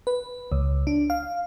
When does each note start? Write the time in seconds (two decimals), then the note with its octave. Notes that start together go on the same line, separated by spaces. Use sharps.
0.07 B4
0.52 C#2
0.87 D4
1.10 F5